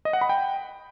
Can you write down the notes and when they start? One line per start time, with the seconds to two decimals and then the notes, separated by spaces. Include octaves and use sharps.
0.05 D#5
0.13 F#5
0.21 B5
0.29 G5